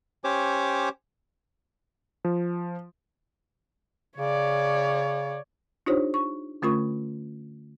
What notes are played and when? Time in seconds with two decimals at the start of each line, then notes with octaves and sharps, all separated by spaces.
0.24 C#4 G4 C5 C#5 D6
2.25 F3
4.18 C#3 C#5 D5
5.86 D4 D#4 F4 G4 C5 C#5
6.14 C#6
6.62 D3 A3 C#4 F4 A#4 C#6